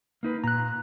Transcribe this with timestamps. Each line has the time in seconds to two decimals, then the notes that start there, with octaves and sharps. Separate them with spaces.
0.23 A#3 D#4 B4
0.44 A#2 A#5 F#6